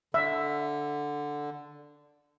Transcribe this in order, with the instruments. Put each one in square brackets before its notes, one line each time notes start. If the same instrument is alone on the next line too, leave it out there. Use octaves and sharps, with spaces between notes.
[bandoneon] D3 [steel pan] E5